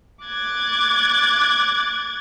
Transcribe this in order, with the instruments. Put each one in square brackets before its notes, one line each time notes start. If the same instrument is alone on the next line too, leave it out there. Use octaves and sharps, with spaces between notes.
[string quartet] D6 F#6 G#6 A6